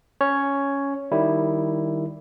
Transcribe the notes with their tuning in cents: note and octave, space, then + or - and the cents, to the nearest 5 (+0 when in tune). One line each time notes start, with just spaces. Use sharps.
C#4 +0 C#5 +5
D#3 -10 G3 +0 E4 +0